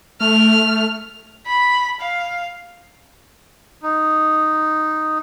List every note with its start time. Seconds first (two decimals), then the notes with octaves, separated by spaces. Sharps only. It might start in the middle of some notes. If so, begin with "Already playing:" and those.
0.21 A3 F6
1.47 B5
2.01 F5
3.83 D#4